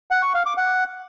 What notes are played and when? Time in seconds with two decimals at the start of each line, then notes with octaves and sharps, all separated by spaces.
0.11 F#5
0.22 C#6
0.34 F5
0.46 D6
0.57 F#5